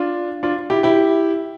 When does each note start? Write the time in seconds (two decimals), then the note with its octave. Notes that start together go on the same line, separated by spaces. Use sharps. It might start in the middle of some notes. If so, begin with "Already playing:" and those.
Already playing: D4 F4
0.43 D4 F4
0.70 E4 G4
0.83 E4 G4